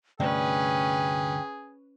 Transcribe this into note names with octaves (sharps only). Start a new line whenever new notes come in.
D2 G2 C3 C#4 G#4 B4 G5